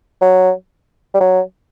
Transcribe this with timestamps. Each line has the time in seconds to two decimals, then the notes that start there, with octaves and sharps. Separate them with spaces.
0.21 F#3
1.14 G3
1.20 F#3